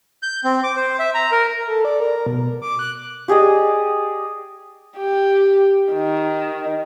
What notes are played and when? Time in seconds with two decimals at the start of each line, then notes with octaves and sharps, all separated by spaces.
0.22 G6
0.44 C4
0.63 D6
0.76 C5
0.99 E5
1.14 A#5
1.32 A#4
1.67 A4
1.85 D5
2.00 A#4
2.27 B2
2.62 D6
2.79 F#6
3.28 G4 G#4 D5 D#5
4.98 G4
5.93 D#3